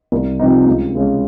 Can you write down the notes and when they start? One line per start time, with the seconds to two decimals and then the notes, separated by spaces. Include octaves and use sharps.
0.12 C2
0.39 C3 F3 C4 D#4
0.67 C#2
0.95 C#3 G#3 C#4